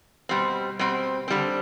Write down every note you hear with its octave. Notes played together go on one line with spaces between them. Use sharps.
B2 G3 C4
B2 G3 C4
D3 G3 C4